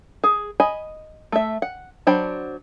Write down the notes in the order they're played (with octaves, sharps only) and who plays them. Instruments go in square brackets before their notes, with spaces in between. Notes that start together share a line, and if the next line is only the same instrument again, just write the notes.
[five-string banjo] G#4
D#5 G#5 B5
A3 E5
F#5
F#3 D4 C5 G5 B5